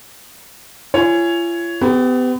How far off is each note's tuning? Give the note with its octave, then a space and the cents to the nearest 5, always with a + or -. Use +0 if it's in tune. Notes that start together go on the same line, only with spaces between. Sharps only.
F4 -45 C#5 +5 G#5 +0
B3 +35 G4 +10